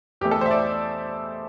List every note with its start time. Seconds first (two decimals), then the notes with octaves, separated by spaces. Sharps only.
0.21 E2 E3 A3 G4
0.31 A4
0.41 C5
0.46 E5
0.51 D5